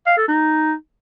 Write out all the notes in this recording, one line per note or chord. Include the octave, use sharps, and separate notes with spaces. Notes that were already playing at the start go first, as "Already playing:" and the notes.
F5
A4
D#4